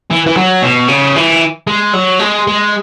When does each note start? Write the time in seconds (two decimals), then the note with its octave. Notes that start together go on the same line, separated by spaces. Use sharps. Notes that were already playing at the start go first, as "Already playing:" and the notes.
0.10 E3
0.26 E3
0.37 F#3
0.62 B2
0.88 C#3
1.16 E3
1.67 G#3
1.94 F#3
2.20 G#3
2.47 G#3